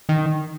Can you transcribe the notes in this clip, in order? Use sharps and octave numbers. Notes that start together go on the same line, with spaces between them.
D#3